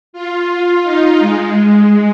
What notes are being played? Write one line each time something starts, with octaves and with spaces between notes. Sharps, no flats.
F4
F4
D#4
G#3
G#3